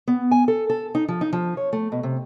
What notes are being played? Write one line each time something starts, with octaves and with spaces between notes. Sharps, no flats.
B3
G#5
A4
A4
D#4
F3
D#4
F3
C#5
A3
B2
C3